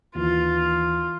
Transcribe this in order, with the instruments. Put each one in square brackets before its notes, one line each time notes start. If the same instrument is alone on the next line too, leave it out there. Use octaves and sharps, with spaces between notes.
[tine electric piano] D#2 E3 [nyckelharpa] F4